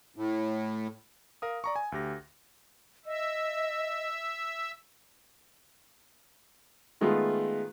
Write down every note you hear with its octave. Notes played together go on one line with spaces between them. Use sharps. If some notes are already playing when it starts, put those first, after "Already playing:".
A2
A#4 F5 D#6
D5 A#5 C#6
G#5
D2 G4 A#6
D#5 E5
D#3 G#3 A3 B3 F4